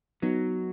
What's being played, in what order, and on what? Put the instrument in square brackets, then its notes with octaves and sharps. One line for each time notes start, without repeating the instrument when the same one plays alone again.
[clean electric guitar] F#3 [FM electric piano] B3 D#4